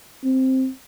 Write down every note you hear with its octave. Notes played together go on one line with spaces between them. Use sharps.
C4